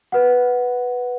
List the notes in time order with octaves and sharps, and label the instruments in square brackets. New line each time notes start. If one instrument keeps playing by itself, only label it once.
[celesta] B4 F#5